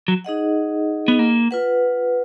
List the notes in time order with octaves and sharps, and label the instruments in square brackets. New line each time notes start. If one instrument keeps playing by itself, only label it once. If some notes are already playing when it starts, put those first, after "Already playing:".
[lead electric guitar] F#3
[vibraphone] D#4 G#4 D#5 F#5
[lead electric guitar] B3
A#3
[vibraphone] F4 B4 F#5